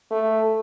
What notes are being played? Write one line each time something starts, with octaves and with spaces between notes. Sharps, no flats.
A3